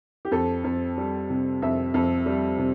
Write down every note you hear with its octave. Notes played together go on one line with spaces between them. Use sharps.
G4
F2 A4
F2
G3
C3
F2 E5
F2
G3
C3